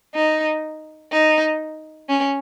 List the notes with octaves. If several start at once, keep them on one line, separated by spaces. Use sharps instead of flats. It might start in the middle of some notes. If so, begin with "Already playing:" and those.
D#4
D#4
C#4